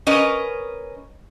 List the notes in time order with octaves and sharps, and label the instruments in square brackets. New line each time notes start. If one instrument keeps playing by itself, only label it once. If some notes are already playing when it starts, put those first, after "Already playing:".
[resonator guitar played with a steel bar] C#4 A#4 B4 D#5